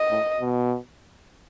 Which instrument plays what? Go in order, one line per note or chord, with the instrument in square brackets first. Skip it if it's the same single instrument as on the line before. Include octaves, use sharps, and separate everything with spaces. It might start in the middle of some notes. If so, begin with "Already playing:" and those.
Already playing: [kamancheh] D#5
[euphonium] A2
B2